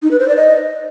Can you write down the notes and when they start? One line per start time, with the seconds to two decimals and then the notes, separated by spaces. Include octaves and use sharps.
0.03 D#4
0.11 B4
0.20 C5
0.28 D5
0.37 D#5